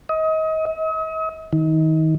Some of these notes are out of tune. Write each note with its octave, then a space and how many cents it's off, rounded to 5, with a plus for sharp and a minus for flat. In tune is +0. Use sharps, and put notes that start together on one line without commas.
D#5 +30
D#5 +45
D#3 +30